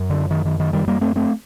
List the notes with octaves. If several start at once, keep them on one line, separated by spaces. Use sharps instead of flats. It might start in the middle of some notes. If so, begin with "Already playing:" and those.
Already playing: F#2
D3
D#3
D#3
D#3
D#3 G3
G3 A#3
A3 C4
A3 C4